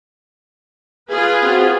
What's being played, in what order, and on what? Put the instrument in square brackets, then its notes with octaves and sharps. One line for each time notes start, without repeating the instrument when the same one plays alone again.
[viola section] F4 G#4 B4
[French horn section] C4 F#4